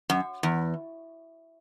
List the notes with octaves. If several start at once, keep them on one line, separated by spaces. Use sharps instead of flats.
F#2
E2